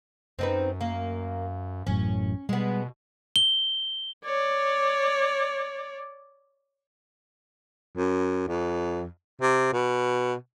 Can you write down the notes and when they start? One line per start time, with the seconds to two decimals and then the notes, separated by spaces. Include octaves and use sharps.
0.39 F#2 C4 D#4 B4
0.81 A#3
1.87 A1 F#2 A2 C#4
2.49 B2 G3 G#3 B3
3.36 G7
4.26 C#5 D5
7.96 F#2
8.48 F2
9.41 C3
9.73 B2